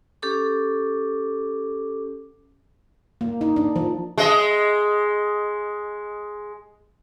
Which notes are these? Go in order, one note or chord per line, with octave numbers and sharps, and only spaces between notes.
C#4 G4 A4 D6
A#3
D#4
D4
F3
G#3 D#5